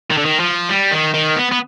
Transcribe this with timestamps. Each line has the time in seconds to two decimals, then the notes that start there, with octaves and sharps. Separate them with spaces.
0.11 D#3
0.18 D3
0.26 D#3
0.40 F3
0.69 G3
0.91 D#3
1.14 D#3
1.36 B3
1.51 B3